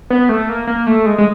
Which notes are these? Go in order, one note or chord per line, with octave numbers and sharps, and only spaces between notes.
B3
A3
A#3
A#3
A3
G#3
G#3